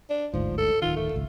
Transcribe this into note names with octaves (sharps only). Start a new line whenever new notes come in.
D4
G1 D2 G#2 F3
A4
D1 D#3 F4
A3
G#1 C#2